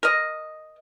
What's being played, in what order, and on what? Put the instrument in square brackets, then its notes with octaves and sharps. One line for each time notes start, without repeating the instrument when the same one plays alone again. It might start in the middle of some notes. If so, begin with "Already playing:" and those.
[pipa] A#4 D#5